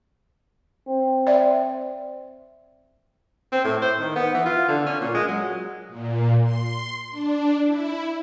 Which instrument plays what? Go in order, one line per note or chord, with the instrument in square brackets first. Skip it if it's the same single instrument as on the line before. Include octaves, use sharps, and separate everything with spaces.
[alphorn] C4
[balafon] D5 E5
[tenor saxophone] C4
A2
C5
D#3
B3
E3
F4
D3
C#4
A#2
G#3
F#3
[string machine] A#2
C6
D4
E4